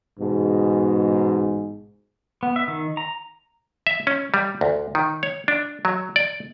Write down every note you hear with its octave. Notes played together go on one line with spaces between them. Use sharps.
A1 G#2 B2 G#4
B3
E5
D#3
A#5
E5
C#4
G3
D2
D#3
C#5
D4
F#3
D5